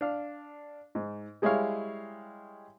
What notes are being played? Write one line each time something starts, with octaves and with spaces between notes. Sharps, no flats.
D4 F5
G#2
G3 G#3 E4 G#4 C#5 F5